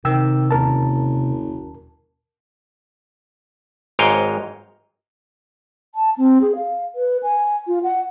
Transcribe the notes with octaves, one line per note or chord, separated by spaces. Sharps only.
C3 D#3 G5 E6
F#1 D#2 A#4 A5
G#1 G#2 C#5 D#5 F5 G5
A5
C4
G#4
F5
B4
G#5
F4
F#5